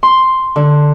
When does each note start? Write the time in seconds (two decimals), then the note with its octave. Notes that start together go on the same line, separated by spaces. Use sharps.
0.03 C6
0.56 D3